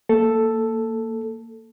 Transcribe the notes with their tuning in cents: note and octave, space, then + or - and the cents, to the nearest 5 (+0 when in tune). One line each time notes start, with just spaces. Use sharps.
A#3 -20 A4 +0